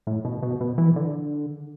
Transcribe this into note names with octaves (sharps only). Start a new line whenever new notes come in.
A2
B2
B2
B2
E3
D3